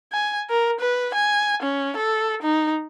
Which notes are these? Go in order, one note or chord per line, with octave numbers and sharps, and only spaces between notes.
G#5
A#4
B4
G#5
C#4
A4
D#4